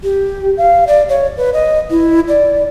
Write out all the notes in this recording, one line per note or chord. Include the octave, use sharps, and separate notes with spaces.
G4
F5
D5
C#5
B4
D#5
E4
D5